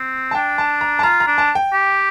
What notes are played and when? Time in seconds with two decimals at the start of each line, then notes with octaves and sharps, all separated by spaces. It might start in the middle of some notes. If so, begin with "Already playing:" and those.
Already playing: C4
0.31 A5
0.35 D4 G5
0.58 A5
0.81 A#5
0.99 A5
1.03 F4 A#5
1.20 A#5
1.26 D4
1.38 A5
1.55 G5
1.73 G4